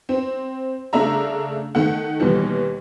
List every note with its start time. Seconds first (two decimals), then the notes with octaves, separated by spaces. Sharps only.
0.09 C4
0.93 C#3 A3 D4 E5 A#5
1.75 D#3 A3 F#5
2.20 D#2 B2 E3 G3